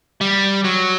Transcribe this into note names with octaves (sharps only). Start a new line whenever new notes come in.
G3
F#3